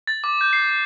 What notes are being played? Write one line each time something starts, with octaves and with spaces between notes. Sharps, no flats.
A6
D6
G6
C7
C7